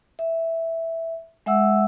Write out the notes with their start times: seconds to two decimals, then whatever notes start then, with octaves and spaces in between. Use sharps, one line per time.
0.19 E5
1.46 G#3 E5 F#5 E6